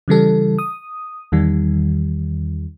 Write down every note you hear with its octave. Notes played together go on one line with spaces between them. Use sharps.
C#3 E3 G3 A4
D#6
E2 D#3 G3